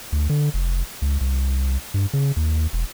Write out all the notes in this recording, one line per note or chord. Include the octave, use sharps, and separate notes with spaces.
D2
D3
F1
C#2
C2
G2
C#3
D#2
E1